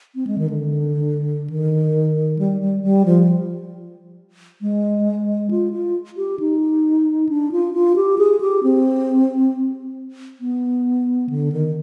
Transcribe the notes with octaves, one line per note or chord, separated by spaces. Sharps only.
C4
G#3
D#3
D3
D#3
G3
G3
G3
F3
G#3
F4
F4
G4
D#4
D4
F4
F4
G4
G#4
G4
C4
B3
D3
D#3